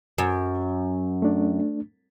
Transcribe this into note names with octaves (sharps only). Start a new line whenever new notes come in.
F#2
A3 D4